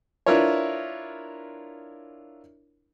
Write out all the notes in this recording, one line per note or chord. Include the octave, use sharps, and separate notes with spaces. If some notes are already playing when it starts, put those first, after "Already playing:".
D4 E4 F4 A#4 B4 C#5